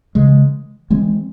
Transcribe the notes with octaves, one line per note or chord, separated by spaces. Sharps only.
C#3 E3 G#3
E3 G#3 C4